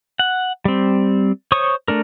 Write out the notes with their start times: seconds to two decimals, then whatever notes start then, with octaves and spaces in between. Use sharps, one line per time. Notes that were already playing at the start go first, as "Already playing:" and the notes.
0.19 F#5
0.65 G3 C4
1.52 C5 C#5 C#6 D#6
1.88 A3 D4 A#4